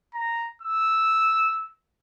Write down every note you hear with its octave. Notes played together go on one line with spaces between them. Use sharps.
A#5
E6